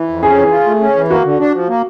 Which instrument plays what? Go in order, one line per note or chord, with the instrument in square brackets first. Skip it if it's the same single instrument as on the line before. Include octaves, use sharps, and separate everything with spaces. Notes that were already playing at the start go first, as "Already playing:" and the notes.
Already playing: [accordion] E3
F2
[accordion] C#4 [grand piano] G#4
[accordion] E3
F4
A3
C#4
E3
[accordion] A#3 [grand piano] F#4
[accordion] D3
D4
F3
A#3